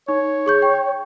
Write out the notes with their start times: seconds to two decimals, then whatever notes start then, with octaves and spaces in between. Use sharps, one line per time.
0.08 D#4 C#5
0.46 G#4 C#6 G6
0.62 G5